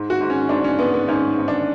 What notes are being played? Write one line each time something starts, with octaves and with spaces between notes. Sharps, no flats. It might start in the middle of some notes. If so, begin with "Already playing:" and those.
Already playing: G#2
F#4
G#2
C#4
G#2 D4
C#4
G#2 B3
B3
G#2 C#4
G#2
D4